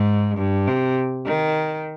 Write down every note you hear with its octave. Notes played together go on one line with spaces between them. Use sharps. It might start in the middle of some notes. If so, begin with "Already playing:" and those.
Already playing: G#2
G2
C3
D#3